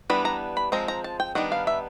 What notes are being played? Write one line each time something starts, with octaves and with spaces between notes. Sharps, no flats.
E3 G3 B3 D4 B5
A#5
B5
F3 G#3 C4 A#5
A#5
A5
G5
D#3 G3 B3 D4 F#5
F5
E5